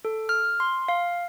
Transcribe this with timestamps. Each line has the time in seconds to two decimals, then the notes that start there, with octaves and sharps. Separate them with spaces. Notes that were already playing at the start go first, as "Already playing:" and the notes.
0.05 A4
0.29 F6
0.60 C6
0.88 F5